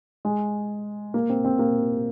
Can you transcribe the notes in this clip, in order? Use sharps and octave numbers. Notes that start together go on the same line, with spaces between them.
G#3
A#3
C4
C4
A#3